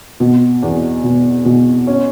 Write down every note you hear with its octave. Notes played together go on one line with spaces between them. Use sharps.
B2
E2
B2
B2
C#4